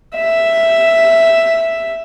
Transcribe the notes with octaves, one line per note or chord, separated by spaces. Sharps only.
E5